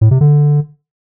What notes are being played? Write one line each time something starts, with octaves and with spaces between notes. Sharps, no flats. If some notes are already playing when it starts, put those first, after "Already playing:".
A2
C3
D3